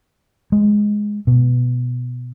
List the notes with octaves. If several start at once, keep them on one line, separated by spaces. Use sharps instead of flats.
G#3
B2